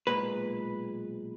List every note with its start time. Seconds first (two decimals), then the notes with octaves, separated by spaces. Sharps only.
0.07 B1 A#2 G#3 B4